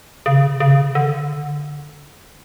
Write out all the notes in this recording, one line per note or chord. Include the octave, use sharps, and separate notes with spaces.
C#3
C#3
D3